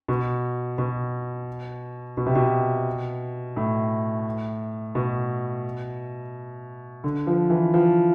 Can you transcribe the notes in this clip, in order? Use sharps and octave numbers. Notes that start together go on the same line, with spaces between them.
B2
B2
B2
C3
B2
A2
B2
D3
F3
E3
F3